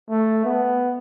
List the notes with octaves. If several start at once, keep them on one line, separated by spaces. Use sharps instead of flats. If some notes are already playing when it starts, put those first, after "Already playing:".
A3
B3